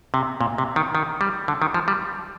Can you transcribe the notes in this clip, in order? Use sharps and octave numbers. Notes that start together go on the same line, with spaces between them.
C3
A#2
C3
D#3
D#3
G3
D3
D#3
F3
G3